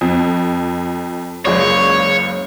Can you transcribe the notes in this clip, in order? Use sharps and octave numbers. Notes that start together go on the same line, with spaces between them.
F2
F#1 C#2 C#5 D5